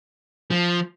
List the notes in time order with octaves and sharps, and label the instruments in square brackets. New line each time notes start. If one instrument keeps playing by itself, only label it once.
[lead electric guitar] F3